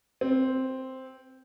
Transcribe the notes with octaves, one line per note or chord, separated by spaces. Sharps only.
C4